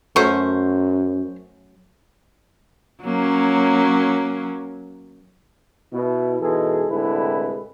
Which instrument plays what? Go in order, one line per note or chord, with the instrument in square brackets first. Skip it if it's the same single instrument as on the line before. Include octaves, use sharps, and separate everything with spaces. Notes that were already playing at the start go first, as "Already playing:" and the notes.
[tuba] F#2 [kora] F#3 A3 C#4 [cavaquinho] C5 C#6
[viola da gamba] F#3 A#3 C#4
[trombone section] B2 E4
G#2 B2 E3 G#3 G#4 A4
C2 A2 D3 G#3 E4 B4